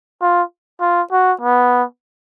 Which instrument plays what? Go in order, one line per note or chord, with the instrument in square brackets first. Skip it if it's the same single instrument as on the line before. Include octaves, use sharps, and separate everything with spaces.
[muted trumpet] F4
F4
F#4
B3